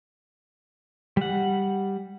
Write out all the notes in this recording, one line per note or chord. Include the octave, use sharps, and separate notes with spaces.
G3 F#5